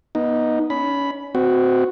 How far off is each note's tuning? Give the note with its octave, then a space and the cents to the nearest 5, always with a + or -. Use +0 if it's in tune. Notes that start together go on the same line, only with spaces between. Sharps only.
B3 -30 D#4 +0
C#4 +30 B5 +0
C4 -25 F#4 +0